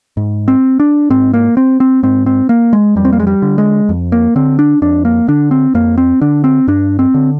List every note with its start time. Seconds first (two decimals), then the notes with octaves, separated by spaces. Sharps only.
0.17 G#2
0.48 C4
0.80 D4
1.10 G#2 C4
1.34 A#3
1.57 C4
1.80 C4
2.03 G#2 C4
2.26 C4
2.49 A#3
2.73 G#3
2.96 F2 G3
3.05 C4
3.13 A#3
3.19 G#3
3.27 G3
3.42 D3
3.58 G#3
3.89 F2
4.12 A#3
4.36 D3 C4
4.59 D4
4.82 F2 D4
5.05 A#3
5.28 D3 D4
5.51 C4
5.74 F2 A#3
5.98 C4
6.21 D3 D4
6.44 C4
6.68 G2 D4
6.99 C4
7.14 D3